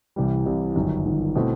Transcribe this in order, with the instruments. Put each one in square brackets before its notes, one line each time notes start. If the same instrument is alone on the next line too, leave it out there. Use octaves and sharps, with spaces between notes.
[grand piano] C2 C3 E3 G3
C2 C3 E3 G3
G1 F#2 D#3
G1 F#2 D#3
B2 A3 C4 E4